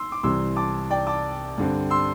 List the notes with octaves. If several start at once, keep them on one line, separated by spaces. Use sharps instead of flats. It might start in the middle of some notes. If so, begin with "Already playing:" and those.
Already playing: C6 E6
D6
C2 C3 E3 G3 C4 C6 E6
A5 D6
D5 G5
A5 D6
G2 D3 C4
C6 E6